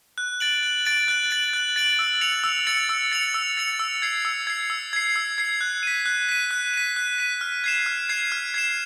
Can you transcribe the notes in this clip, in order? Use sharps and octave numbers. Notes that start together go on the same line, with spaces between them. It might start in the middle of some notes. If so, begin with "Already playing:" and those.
F#6
A6 D7 F#7
F#6
A6 D7 F#7
F#6
A6 D7 F#7
F#6
A6 D7 F#7
E6
A6 C#7 F7
E6
A6 C#7 F7
E6
A6 C#7 F7
E6
A6 C#7 F7
E6
G#6 C7
E6
G#6 C7
E6
G#6 C7
E6
G#6 C7
F#6
B6 D#7
F#6
B6 D#7
F#6
B6 D#7
F#6
B6 D#7
F6
G#6 C7 E7
F6
G#6 C7 E7
F6
G#6 C7 E7